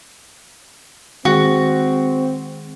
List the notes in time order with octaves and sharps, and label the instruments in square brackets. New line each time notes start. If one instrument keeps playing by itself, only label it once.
[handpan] D#3 G#3 G#4 [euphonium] C4 [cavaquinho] F#4